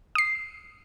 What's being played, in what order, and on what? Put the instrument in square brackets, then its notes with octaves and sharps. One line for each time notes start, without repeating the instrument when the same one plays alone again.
[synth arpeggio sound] D#6 C7